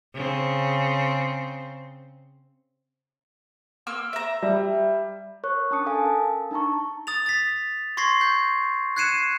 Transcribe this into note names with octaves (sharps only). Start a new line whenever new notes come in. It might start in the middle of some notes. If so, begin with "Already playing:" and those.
C#3 C4
A#3 E6 F6
E5 A#5
G3
A#4 C#5 C#6 F#6
C#4 D4 A5 D6 D#6 C#7
A4 F5 G#5 A5
A#4
D4 D#4 A5 A#5 C#6
D#6 A6 F7
A6 B6
C6 C#6 G#6 A#6 C7
G6
F#6 G#6 C7 C#7 D#7 E7